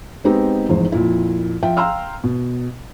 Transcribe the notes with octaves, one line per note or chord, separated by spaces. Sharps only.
G#3 B3 C4 D#4 G4
F1 E2 G#2 C5
F2 A#2 E4
F3 E5 G5
F5 G5 A#5 C6 E6 F6
B2